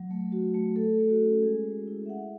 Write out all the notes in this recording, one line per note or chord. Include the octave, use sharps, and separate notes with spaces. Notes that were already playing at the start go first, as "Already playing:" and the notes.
Already playing: F#3
A3
F#4
A3
A3 A4
A3
F#4
C#4
G#3 G#4
G#3
E4
E5
E4 F#5